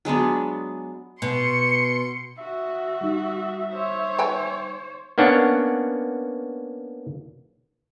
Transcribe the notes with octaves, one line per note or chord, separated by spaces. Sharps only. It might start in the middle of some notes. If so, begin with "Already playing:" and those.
F#3 G#3 B3 D4
B2 C6 C#7
F#4 E5
G3 D#4
C5 C#5
B4 G5 G#5
A#3 B3 C#4 D4 C#5 F#5